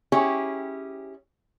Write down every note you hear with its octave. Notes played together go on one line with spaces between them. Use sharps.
C#4 E4 G4 G#4 C#5